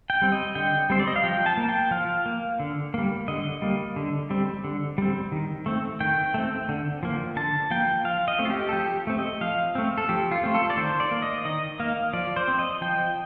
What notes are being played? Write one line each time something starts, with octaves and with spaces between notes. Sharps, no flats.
G5
G3 C4
D#5
D3 G5
G3 C4 C5
D5
D#5
F5
F3 G5
A5
A#3
G5
F3 F5
A#3
D3
G3 A#3
D3 D#5
G3 A#3
D3
G3 C4
D3
G3 C4
D#3
A3 C4
D#3 G5
A3 C4
D3
F3 A#3
D3 A5
F3 A#3 G5
F3 F5
D#5
A3 C4
F4
G4
A4
F3 G4
A3 C4
D#5
F3 F5
A3 C4
A4
F3 G4
F4
A3 C4
A4
D5
D#3 C5
D5
A#3
D#5
D#3 D#5
A#3 F5
F3 D5
C5
C4
D#5
F3 G5